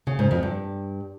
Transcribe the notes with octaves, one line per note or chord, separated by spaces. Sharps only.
C#3
G#2
F2
G2